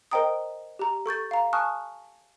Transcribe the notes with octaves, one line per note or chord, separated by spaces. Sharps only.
A#4 C5 D#5 G5 A#5 D#6
G4 A#5
A4 C#6 G6 A6
F5 A#5
G#5 A5 C#6 D#6 F6 F#6